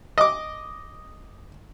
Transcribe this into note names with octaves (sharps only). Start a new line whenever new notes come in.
D#5 D6